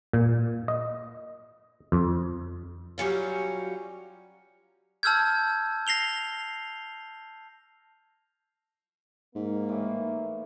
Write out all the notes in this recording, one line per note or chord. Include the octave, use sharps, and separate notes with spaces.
A#2
D#5
F2
F#3 G3 C#4 F4
A5 E6 F6 G6 G#6
A#6 C7 F7 G7
G#2 A#3
A2 E3